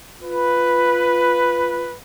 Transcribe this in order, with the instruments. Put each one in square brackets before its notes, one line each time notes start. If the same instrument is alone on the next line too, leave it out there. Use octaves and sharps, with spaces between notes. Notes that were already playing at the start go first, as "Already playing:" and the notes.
[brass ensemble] F4 B4